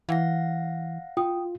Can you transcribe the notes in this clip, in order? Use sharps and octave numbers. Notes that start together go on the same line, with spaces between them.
E3 F5 F#5 A#6
F4 G5 D#6